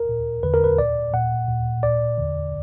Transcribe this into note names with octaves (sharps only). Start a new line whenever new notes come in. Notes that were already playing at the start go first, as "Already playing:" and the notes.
Already playing: A#4
A#2
E2 D3 B4
A#4
B4
A#2 D5
A#2 F#5
A#2
A#2 D5
E2 D3